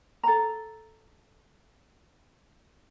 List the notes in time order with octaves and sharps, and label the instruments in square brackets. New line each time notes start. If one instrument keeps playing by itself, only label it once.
[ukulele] A4 A#5